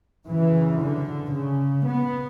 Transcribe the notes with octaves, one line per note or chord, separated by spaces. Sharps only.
F#2 C#3 E3
D3
C#3
B3